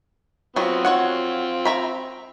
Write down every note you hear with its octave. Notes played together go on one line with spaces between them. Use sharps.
F#3 B3 C4 F4
F#4 C#5 F#5
E5 A#5 B5